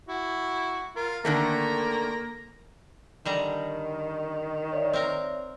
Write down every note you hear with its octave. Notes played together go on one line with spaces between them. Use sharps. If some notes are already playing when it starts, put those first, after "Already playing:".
E4 F#4
F4 A#4
D3 D#3 A3 A#3 A#5
D3 D#3 G3 A#5
C#5 D5 E5
C4 A#4